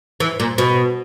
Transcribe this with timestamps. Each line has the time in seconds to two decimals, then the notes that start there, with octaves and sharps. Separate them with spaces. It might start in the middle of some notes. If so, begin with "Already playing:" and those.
0.20 E3
0.40 A#2
0.58 B2